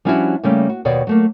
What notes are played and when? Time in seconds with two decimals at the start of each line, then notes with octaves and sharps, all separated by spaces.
0.05 F3 G3 C#4 D4 E4 F#4
0.43 C#3 G3 A3 A#3 C#4
0.69 F#4
0.85 D#2 B2 C#5 D5
1.07 F#3 A3 A#3